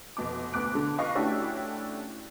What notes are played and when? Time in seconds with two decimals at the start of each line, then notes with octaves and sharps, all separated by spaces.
0.17 F1 B2 D6
0.53 D2 B3 D6 F#6 D7
0.75 D3
0.98 F4 B4 D#5 F5 C#6
1.15 A3 C#4 D4 E4 F#4 G4